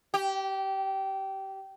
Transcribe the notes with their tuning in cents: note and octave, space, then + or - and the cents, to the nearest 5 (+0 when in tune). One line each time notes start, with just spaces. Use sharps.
G4 -20